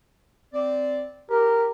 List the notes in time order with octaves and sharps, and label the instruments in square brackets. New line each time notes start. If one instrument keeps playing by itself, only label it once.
[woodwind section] C4 D5
[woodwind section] G4 [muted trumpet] A#4